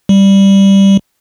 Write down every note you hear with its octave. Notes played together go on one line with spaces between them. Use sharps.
G3